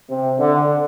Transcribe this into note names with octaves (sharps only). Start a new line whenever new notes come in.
C3
D3